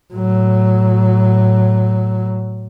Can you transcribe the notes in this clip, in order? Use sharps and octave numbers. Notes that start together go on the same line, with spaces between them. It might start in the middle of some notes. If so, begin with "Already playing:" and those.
A2 F#3